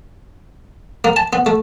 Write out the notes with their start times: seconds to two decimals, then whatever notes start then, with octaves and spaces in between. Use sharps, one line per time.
1.04 A#3
1.16 A5
1.33 B3
1.46 A3